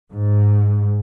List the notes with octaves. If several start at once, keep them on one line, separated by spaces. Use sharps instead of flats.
G#2